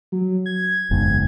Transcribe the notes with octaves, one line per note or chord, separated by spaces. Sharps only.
F#3
G#6
F#1 E2 G#2